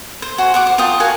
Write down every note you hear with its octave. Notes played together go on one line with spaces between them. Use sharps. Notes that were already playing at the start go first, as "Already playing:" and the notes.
C5
F#4 C5 G#5
F#5 C#6 D6
C5
F4 G5 A5 D#6
F#4 A#4 F5 G#5